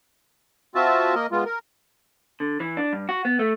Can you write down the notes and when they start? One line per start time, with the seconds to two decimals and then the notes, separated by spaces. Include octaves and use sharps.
0.75 C4 F4 F#4 E5 A5
1.15 A#3 A#4 D#5
1.32 G#3 B3 F4
1.45 A#4
2.40 D3
2.60 E3
2.77 D4
2.93 G2
3.09 F#4
3.25 B3
3.39 A3